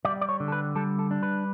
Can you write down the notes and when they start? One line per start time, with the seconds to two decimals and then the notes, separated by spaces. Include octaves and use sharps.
0.05 G3 D5
0.21 D5
0.29 C#5
0.40 D3
0.48 A4
0.52 B4
0.75 G3 A4
0.99 A4
1.11 D4
1.23 B4